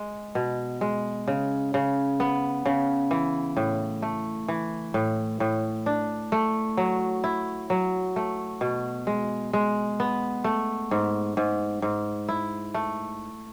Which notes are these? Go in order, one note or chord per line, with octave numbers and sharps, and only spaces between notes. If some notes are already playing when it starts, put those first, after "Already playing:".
Already playing: G#3
B2
G#3
C#3
C#3
B3
C#3
E3
A2
A3
E3
A2
A2
D4
A3
F#3
E4
F#3
A3
B2
G#3
G#3
B3
A3
G#2
G#2
G#2
E4
A3